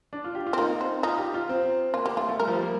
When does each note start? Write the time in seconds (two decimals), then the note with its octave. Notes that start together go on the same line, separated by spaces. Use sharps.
0.13 D4
0.24 F4
0.35 G4
0.47 F4
0.53 C4
0.58 A#3 D#4
0.81 C4
1.03 D#4 F4
1.18 G4
1.34 F4
1.49 C4
1.94 A#3 F4
2.06 A#3 G4
2.17 A3 F4
2.29 A3
2.40 G3 A#4
2.48 F3
2.54 G3
2.63 A#3